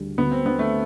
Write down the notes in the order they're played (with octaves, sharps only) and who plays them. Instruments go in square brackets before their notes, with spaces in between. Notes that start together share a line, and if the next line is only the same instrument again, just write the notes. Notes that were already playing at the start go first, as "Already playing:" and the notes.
Already playing: [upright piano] D2 D3 G3
[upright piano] D2 [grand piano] B3
[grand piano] C4
[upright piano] D3 [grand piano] B3
[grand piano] A3